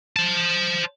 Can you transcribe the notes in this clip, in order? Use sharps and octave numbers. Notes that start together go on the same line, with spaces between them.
C5 A5